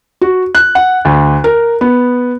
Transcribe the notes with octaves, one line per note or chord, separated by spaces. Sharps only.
F#4
F#6
F#5
D2
A#4
B3